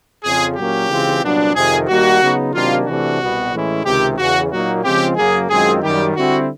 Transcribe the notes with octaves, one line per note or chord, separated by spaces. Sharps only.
F2 C#3 F3 G#4
A#2 F#3 A#3 C#4 G4
C#3 E3 G#3 C4 F4
C2 A#2 F#3 B3 D4
F2 C3 D#3 G#4
D#2 D#3 G3 A#3 F#4
C#3 F#3 B3 D#4
C3 D#3 F#3 A#3 D4 F4
C3 E3 A3 D4 F#4
C2 B2 G3 B3
A2 E3 G#3 C#4 E4
C#2 C3 D#3 G4
E2 C#3 E3 F#4
A#2 F#3 A#3 D#4 F#4
C#3 F3 G#3 C4 F4 G4
F#2 C#3 F#3 A#3 G#4
F#2 D#3 G#3 C4 F4 G#4
F#2 D#3 G3 G4
D3 G3 C4 E4 F#4